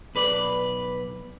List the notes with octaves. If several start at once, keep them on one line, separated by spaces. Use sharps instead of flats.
B1 B4 D5